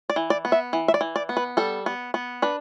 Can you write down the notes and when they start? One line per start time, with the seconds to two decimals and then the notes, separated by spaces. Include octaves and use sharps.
0.10 D5
0.16 E3
0.30 D5
0.45 B3
0.52 E5
0.73 E3
0.88 E5
0.94 D5
1.01 E3
1.16 D5
1.29 B3
1.37 B4
1.57 G3 A4
1.86 B3
2.14 B3
2.42 D4 B4